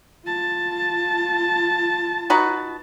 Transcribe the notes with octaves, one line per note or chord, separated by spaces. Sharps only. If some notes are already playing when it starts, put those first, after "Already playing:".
F4 A5
D#4 F#4 B4